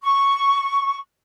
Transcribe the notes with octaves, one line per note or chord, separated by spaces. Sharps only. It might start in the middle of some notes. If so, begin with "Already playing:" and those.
C#6